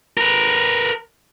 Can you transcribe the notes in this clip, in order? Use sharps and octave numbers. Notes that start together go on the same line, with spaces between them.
A#4 B4